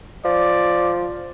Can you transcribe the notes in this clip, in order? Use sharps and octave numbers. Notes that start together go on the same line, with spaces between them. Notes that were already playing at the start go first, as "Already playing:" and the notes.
F3 D5